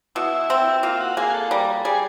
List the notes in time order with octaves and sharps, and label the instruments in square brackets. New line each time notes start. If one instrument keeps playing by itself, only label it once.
[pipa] B2 [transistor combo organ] E4
[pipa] C4
[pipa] A#3 [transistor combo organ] F4
[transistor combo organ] F#4
[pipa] A#3 [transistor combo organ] G#4
[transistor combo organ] A4
[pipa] G3 [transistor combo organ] A#4
[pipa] G3 [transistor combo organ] G#4